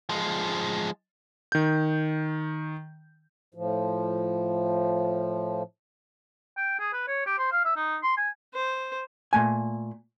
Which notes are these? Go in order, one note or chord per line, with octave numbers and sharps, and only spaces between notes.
F3 G#3
D#3 G6
A2 F3
G5
G#4
B4
C#5
G4
C5
F5
E5
D#4
C6
G#5
C5
A#2 A3 G#5